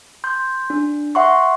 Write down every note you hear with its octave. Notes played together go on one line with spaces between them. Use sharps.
C6 G6
D4
E5 F#5 C6 C#6